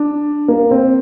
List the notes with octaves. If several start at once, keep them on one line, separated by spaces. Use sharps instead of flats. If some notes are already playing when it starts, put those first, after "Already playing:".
Already playing: D4
A#3
C4